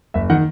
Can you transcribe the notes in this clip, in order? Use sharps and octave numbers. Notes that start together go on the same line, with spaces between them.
F#1 E5
D#3 F#5